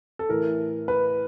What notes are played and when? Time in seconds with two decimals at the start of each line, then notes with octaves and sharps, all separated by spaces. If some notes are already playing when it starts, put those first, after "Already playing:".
0.19 A4
0.29 A2 E3 A#4
0.88 B4